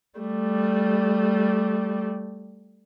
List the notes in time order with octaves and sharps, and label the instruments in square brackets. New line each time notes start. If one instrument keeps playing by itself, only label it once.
[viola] G3 A3